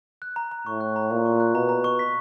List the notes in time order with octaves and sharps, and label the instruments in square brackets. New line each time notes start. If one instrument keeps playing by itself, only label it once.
[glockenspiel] F#6
A#5
A#5
[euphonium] A2 [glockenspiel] C#6
[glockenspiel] F#6
A#5
[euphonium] A#2 [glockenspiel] A#5
[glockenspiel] C#6
F#6
[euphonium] B2 [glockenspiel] A#5
[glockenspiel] A#5
C#6
B6